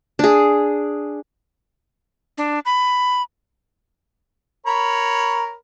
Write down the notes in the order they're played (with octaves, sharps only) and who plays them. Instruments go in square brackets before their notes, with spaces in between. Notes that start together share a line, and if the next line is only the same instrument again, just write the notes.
[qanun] D4 G#4
[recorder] D4
B5
[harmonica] A#4 C#5 B5